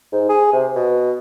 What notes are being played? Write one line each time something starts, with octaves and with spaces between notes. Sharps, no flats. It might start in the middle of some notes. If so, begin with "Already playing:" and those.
G#2
G#4
C3
B2